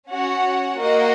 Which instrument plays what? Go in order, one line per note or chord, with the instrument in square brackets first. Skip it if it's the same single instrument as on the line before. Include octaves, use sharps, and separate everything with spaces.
[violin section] C#4 F#4 C#5 F#5
A#3 F#4 A#4 D#5 F#5